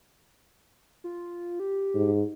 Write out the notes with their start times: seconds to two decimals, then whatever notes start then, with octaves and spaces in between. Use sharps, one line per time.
1.04 F4
1.60 G4
1.95 G#2